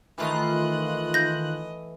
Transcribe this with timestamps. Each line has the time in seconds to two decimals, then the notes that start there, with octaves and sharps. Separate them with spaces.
0.18 D#3 E3 A3 F4 D#5 F#6
1.14 G6 A#6